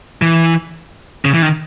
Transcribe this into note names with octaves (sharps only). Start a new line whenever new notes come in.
E3
C#3
E3
D#3